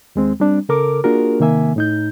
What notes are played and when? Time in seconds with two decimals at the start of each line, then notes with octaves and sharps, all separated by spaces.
0.16 D#2 G#3 C4
0.40 G3 C4 D4
0.69 C#3 A4 A#4 D6
1.04 A#3 D4 F4 F#4 G#4 A#4
1.40 C3 D#3 A#3 E5 G#5
1.76 A2 D#4 G6